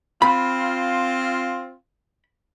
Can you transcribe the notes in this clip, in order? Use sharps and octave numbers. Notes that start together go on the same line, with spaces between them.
C4 F4 B5